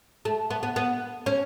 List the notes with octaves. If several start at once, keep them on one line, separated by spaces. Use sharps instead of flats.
A3
B3
B3
B3
C#4